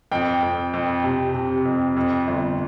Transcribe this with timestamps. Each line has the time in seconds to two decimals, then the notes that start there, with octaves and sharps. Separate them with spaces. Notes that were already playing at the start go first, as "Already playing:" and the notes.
0.11 F2 G5
0.43 F2
0.74 F2
1.04 C3
1.35 C3
1.65 F2
1.96 F2
2.28 G1